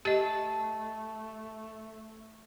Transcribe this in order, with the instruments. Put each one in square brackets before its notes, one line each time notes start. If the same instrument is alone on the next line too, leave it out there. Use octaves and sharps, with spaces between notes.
[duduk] A3 [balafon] G4 D#5 [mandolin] A5